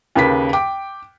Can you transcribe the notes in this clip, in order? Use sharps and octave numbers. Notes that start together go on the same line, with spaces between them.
D#2 C#3 A#3 B4 B6
G5 D6